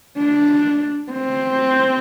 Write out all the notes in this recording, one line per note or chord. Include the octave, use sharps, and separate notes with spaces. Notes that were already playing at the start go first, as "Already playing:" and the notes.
D4
C4